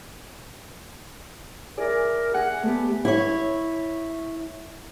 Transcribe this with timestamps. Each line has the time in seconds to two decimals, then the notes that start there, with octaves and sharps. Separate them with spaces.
1.77 E4 G#4 A#4 D5
2.34 E4 G#4 F#5
2.63 A3 B3 G4
3.05 E4 C#5